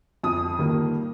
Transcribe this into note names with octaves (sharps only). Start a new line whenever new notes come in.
F2 D#6
D#3 G3 A#3